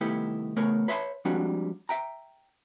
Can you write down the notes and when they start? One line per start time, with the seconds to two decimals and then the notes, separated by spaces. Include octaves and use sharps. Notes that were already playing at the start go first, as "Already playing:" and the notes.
0.01 C2 D#3 A3 B3 E4 G4
0.56 E2 C#3 A3 B3 A#4 C#5
0.88 B4 C#5 E5 A5 B5 C6
1.25 F3 G3 G#3 C4 D4 F#4
1.89 E5 G5 A#5